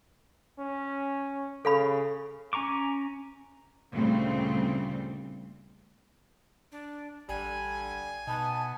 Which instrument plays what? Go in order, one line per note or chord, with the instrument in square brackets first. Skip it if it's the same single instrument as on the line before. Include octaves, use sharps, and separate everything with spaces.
[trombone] C#4
[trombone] C#3 [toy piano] A4 F5 B5
[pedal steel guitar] C#4 G#5 A#5 C#6 D6
[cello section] D2 A#2 C#3 G3 A3 C4
[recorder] D4
[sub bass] A1 [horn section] D3 G3 [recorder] G#5
[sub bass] B2 [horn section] B3 D#4 [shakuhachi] A5